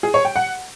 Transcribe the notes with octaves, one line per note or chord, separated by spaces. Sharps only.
G#4
C#5
G5
F#5